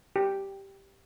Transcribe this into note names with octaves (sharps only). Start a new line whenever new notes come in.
G4